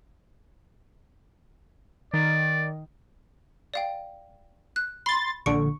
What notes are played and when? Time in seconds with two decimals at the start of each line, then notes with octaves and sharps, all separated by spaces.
2.14 D#3 D5
3.74 D5 F5 G5
4.76 F#6
5.06 B5 C6 A6
5.46 A#1 D3 C#6 C#7 D7